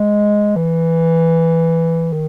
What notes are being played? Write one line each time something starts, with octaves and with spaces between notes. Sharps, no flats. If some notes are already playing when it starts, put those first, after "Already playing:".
Already playing: G#3
E3
D#3